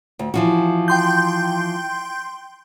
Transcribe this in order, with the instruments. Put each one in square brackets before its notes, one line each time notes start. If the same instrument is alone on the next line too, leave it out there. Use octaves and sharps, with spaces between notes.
[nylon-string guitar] D2
E3 F3 F#4
[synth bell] G5 C6 G6